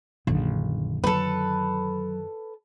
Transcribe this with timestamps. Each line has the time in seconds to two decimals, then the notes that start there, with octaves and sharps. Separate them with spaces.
0.27 A#1 F#2 D3 D#3
1.04 F#3 A4 B4